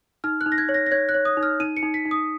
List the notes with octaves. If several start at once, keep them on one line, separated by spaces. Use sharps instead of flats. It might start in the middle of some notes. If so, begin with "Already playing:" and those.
D#4 F6
F#6
D#4
A#6
G#6
C#5
A#6
A#6
C#5 G#6
F#6
C#5
D#6
D#4
F6
D#4 D#7
C#7
D#4
B6
D#4
D#6